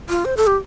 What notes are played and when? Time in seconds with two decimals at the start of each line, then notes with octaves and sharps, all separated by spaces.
0.10 F4
0.25 C5
0.37 A4
0.47 G4